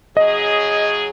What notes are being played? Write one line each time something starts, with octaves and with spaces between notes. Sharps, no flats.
C#3 F#3 G#4 D#5